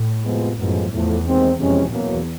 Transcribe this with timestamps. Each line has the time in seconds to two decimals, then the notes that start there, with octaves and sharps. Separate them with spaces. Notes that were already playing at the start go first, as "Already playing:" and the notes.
Already playing: A2
0.24 F2 C3 F3 G#3 B3
0.57 A1 F#2 A2 F3 G#3 B3
0.91 E2 A2 F3 A3
1.24 D#2 D#3 G#3 C4
1.58 F2 C3 E3 G#3 C#4
1.91 E2 B2 F#3 A#3 C#4